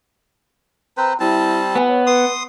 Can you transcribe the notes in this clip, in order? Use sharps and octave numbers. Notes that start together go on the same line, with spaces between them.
C4 B4 C5 A#5
G3 C4 E4 A5
B3 G#5
C#5
B4 C6 D#6